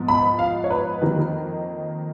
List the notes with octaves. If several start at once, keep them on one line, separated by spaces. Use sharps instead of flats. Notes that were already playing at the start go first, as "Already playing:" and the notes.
Already playing: G#2 F3 B3
B5
F5
C#5
B4
F2 D#3 A#3 D#4